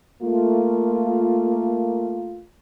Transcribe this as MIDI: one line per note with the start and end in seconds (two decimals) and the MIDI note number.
0.22 2.45 57
0.22 2.45 58
0.22 2.45 65